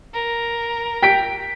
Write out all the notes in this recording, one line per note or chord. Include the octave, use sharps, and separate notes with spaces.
A#4
G5 B6 D7